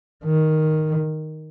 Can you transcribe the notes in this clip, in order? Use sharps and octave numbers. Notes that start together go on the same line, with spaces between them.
D#3